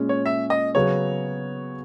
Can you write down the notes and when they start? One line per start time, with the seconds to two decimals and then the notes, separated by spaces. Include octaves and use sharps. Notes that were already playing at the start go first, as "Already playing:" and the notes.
Already playing: A#2 G#3 C#4
0.09 C#5
0.26 E5
0.50 D#5
0.75 C#3 F#3 B3 F#4 C#5